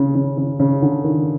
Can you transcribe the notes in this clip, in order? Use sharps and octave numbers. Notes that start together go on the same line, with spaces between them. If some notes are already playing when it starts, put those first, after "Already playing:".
Already playing: C#3
C#3
C#3
C#3
D3
D#3